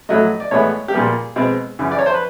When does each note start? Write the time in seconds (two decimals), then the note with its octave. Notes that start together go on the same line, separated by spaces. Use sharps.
0.09 A2 F#3 A3 D#5
0.40 D5
0.51 A2 E3 G#3 B3 C#5
0.88 G4
0.94 A#2 G3 A#3 G#4
1.36 B2 G#3 C4
1.79 F#2 C#3 E3
1.91 D5
1.99 C#5
2.06 C5
2.14 B4